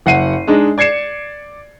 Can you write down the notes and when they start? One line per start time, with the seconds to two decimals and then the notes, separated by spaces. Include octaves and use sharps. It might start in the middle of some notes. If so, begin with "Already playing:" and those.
0.06 F#1 F#5 C7 D#7
0.48 G#3 D4 D#4
0.78 D5 G#6 C7 C#7 E7